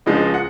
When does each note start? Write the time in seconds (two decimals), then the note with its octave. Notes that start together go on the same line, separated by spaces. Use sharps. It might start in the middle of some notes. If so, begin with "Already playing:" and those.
0.06 C#2 C#3 F3 G#3 D#5
0.34 F#5